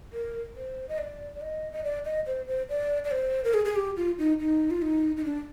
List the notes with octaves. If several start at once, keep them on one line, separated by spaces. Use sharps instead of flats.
A#4
C5
D#5
D5
D5
D#5
D#5
D5
D#5
C5
C5
D5
D5
C5
A#4
G#4
G#4
G4
F4
D#4
D#4
F4
D#4
D#4
D4